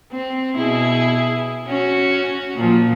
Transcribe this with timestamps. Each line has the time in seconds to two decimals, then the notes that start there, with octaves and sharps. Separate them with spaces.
0.12 C4
0.56 B2 E4 G#4
1.67 C#4 F#4
2.55 A#2 F3